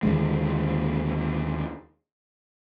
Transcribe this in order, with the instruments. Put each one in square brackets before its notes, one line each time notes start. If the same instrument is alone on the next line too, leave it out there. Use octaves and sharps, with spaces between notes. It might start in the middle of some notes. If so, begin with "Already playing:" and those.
[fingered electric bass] D#2 D3 G#3